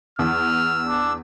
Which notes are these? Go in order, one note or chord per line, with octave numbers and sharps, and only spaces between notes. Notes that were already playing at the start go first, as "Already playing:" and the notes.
E2 E6 F6
D4